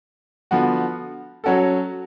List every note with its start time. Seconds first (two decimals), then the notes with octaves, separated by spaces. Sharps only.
0.51 D3 F3 B3 F#4
1.44 F#3 C#4 F#4 A4